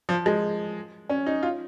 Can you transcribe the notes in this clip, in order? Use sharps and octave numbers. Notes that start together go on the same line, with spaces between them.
F3
G#3
C#4
D#4
F4